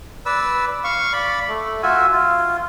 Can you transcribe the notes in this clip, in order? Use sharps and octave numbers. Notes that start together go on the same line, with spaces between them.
B4 D5 E6
F5 C#6
D5 B5
A3
F4 F#4 E5 G#5
F4